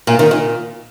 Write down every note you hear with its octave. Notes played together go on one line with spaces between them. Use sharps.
A#2
D#3
A#2